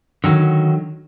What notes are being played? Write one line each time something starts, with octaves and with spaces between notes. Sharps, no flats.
D3 D#3 F#3